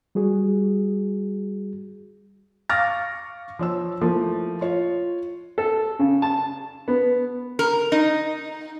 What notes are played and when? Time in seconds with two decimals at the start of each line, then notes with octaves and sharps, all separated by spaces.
0.15 G3 F#4 G#4
2.69 F5 C#6 D6 F6 A6 A#6
3.59 F3 C#5 E6
4.01 F3 A3 A#3 E4
4.61 F4 C#5
5.58 A4
5.99 C#3
6.22 A5
6.88 B3
7.59 A#4
7.92 D#4